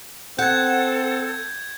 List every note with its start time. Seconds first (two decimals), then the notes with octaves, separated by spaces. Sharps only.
0.39 C4 A4 F#5 G6 G#6